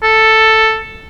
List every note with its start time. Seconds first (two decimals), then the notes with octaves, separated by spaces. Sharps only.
0.03 A4